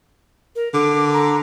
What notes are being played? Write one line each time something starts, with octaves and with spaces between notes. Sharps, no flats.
A#4
D3 D6
A#5